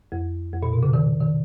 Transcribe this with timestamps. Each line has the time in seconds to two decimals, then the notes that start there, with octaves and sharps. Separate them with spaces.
0.12 F2
0.53 F2
0.63 A#2
0.73 B2
0.83 C#3
0.93 D#3
1.20 D#3